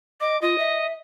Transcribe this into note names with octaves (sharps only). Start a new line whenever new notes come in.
D#5 D6
F4 D#5
E5